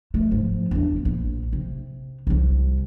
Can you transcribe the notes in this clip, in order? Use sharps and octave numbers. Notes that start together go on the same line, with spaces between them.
A3
G#2 F3
E2 D4
A#1
C3
C2 G3